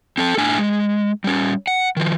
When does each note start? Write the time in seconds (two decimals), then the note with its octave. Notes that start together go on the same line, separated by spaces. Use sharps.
0.18 C4 A4 A5
0.37 A2 D4 G#5
0.58 G#3
1.24 G3 C#4
1.67 F#5
1.97 D#3 F3